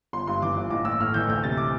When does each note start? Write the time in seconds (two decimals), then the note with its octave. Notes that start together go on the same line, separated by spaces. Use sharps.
0.13 G1 C6
0.27 G2 C6
0.42 E3 D6
0.57 G1
0.70 A1 D6
0.85 A1 E6
1.00 A2 F6
1.14 E3 G6
1.28 D2 G6
1.44 C3 A6
1.57 D6